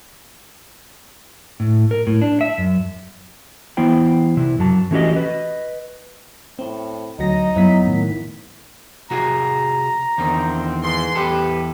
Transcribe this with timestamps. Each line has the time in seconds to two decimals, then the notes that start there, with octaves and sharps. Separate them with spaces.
1.60 A2
1.91 A#4
2.07 A2
2.22 D4
2.41 E5
2.58 F#2
3.77 E3 B3 E4 C5 G5
4.37 C3 E4
4.59 F#2 F#3 A5
4.91 E3 A3 C#4 F#4 G4 D#5
5.13 B4 D#5
6.59 A2 C4
7.19 D2 F#3 D#4 A#6
7.56 F#2 F#3 B3 E4 E5 B6
7.87 A2 D#3
9.11 C3 F#4 G#4 A#5
10.18 E2 D3 D#3 C4
10.82 G#2 B4 C6
11.15 E2 G4 A4 B4